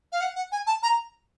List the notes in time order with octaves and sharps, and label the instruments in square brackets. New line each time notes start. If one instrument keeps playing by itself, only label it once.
[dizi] F5
F#5
F#5
G#5
A5
A#5